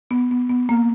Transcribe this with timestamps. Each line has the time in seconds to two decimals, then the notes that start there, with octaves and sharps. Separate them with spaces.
0.11 B3
0.31 B3
0.50 B3
0.69 A#3